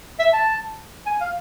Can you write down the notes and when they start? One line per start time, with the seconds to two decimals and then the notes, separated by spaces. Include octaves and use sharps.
0.19 E5
0.33 A5
1.06 G#5
1.21 F5